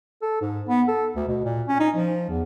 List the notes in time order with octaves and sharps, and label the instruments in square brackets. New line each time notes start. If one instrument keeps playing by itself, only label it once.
[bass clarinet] A4
G#2
B3
A4
D2
B2
A#2
C#4
D#4
F3
E2